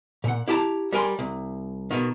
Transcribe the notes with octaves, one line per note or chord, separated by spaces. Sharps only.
A#2 F#5
E4 G4 A5 A#5
G3 A#4 G#5 C6
C2
B2 D#3